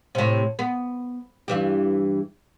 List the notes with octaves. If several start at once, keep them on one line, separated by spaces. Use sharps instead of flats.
A2 C3
B3
G2 E3 G4